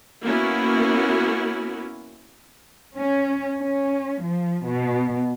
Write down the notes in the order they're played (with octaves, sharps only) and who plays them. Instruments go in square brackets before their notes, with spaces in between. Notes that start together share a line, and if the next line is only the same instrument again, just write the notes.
[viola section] A#3 B3 C#4 E4 F#4
[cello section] C#4
C#4
F3
B2